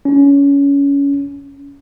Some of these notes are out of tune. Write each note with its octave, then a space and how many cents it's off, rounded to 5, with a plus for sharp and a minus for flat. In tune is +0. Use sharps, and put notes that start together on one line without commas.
C#4 +20